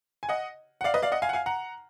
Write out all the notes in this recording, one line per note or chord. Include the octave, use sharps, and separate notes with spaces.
G#5
D#5 F#5
F#5
D5 F5
B4 D#5
D5 F5
D#5 F#5
F5 G#5
F#5
F5 G#5
F#5 A#5